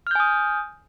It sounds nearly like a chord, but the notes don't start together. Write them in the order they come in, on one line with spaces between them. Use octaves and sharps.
F6 G6 G#5 D#6